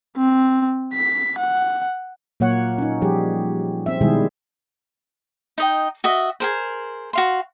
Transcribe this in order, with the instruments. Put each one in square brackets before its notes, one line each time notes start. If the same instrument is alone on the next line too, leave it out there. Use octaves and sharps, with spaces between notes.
[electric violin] C4
B6
F#5
[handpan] A#2 F#3 A#3 C#5 F#5
C#4 D#4
F3 G3 G4 G#4
C4 E5
B2 D#3 G3 G#3 E4 G#4
[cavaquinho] D#4 D#5 G5
F#4 D#5 E5
G#4 A#4 C5
F#4 F5 C6